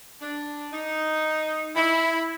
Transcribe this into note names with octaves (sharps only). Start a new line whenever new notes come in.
D4
D#4
E4